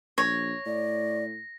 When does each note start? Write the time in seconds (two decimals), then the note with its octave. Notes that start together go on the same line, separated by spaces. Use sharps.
0.18 A#1 C#5 A#6
0.66 A2 D5